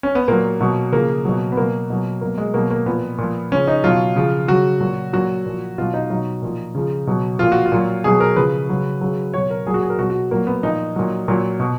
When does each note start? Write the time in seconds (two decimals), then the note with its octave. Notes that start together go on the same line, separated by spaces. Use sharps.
0.03 C#4
0.15 B3
0.28 A#2 F#3 A#3
0.61 B2 F#3
0.92 C#3 F3 A#3
1.25 B2 F#3
1.52 B3
1.57 B2 F#3 A#3
1.90 B2 F#3
2.21 B2 F#3 A#3
2.38 G#3
2.54 B2 F#3 A#3
2.71 A#3
2.86 A#2 F3 B3
3.18 A#2 F3
3.52 C#3 F3 C#4
3.68 D#4
3.84 B2 F#3 F4
4.16 C#3 F3
4.48 C#3 F#3 F#4
4.80 A#2 F#3
5.13 A#2 F#3 F#4
5.46 A#2 F3
5.78 B2 F#3 F4
5.94 D#4
6.10 B2 F#3 D#4
6.42 A#2 F3
6.75 C#3 F3
7.07 B2 F#3
7.39 A#2 F3 F4
7.52 F#4
7.66 F4
7.72 A#2 F#3
8.04 B2 F#3 G#4
8.20 A#4
8.36 C#3 F3 B4
8.69 C#3 F#3
9.01 C#3 F#3
9.34 B2 F#3 C#5
9.51 A#4
9.66 A#2 F#3 G#4
9.74 F#4
9.83 G#4
9.90 A#4
9.99 B2 F#3 F#4
10.10 F#4
10.31 A#2 F#3 A#3
10.47 B3
10.63 A#2 F3 D#4
10.96 A#2 F#3
11.28 A#2 F#3
11.60 B2